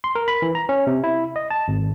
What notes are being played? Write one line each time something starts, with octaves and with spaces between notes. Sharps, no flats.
C6
A#4
B5
E3
A#5
C#4
C3
E4
D#5
A5
G#1